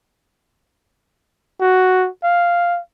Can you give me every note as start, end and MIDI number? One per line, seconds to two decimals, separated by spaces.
1.60 2.09 66
2.23 2.80 77